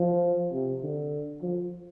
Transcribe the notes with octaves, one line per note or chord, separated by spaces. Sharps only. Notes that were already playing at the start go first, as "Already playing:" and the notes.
Already playing: F3
C3
D3
F3